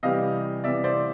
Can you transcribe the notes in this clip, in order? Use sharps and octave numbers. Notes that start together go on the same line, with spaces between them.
C3 E3 G3 D#5 F5
C3 E3 G3 D5 E5
C5 D5